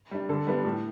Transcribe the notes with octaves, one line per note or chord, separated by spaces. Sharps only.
G3 D4
D3 A4
G3 B3 D4
A2